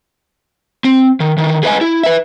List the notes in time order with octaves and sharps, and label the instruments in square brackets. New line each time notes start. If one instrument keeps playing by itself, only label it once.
[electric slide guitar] C4
D#3
D#3 E3
G#4 B4 C#5 D#5 G#5
E4
B4 E5